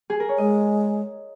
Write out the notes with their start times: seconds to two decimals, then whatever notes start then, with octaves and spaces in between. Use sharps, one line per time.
0.10 G#4
0.20 A#4
0.29 C#5
0.38 G#3 D#5